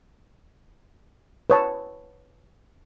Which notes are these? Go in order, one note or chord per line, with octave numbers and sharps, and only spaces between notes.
B4 C#5 A5